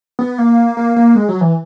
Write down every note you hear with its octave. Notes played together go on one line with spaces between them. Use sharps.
B3
A#3
A#3
A#3
G#3
F#3
E3